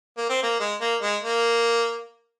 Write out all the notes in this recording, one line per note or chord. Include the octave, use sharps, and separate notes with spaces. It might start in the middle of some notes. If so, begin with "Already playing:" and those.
A#3
C4
A#3
G#3
A#3
G#3
A#3